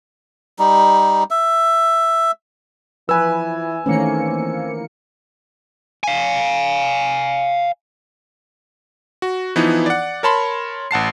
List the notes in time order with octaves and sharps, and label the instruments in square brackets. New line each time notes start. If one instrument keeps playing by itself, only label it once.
[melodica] G3 D#4
E5
[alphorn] E3 [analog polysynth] F3 [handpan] B4 [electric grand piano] G#5 E6
[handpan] D#3 A3 C#4 [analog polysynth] E3 A#3 C#7 [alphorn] C4
[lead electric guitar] F5 G#5
[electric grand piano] F#4
E3 F3 B3 D#4 E4
D5 F#5
A#4 C#5 A5 B5 C6
A1 F#5 A5 C7